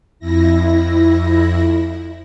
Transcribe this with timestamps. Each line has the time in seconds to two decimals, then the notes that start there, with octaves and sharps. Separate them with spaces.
0.19 F2 E4 A#6